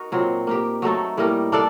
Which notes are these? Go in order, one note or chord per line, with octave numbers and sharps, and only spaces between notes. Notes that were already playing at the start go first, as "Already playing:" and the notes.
Already playing: D#4 F#4 A#4
A#2 F#3 C4
A#3 D#4 G4
F#3 A3 D#4 A4
A2 G3 A#3 D#4
A#3 D4 A4 D5